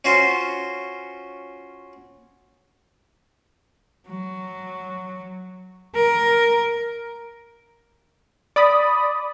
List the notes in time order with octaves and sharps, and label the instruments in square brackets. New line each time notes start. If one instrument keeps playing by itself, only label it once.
[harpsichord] C#4 F4 F#4 C5
[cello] F#3
A#4
[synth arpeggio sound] D5 B5 D#6